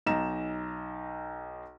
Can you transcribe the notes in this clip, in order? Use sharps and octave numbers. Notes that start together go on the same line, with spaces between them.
B1 D#4 A#5 E7